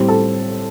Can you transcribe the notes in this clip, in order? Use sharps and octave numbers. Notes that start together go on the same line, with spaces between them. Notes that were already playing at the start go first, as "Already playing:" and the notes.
Already playing: A2 G3 C4
A4